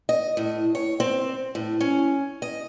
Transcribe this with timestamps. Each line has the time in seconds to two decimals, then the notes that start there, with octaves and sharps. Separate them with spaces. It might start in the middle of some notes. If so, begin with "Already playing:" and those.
0.09 D#5
0.37 A2
0.75 C#5
1.00 C4
1.55 A2
1.81 C#4
2.42 D#5